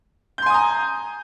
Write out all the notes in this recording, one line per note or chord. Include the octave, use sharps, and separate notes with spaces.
G#5 A#5 C6 D#6 G6